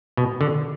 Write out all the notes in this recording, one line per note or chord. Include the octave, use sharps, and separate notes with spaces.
B2
D3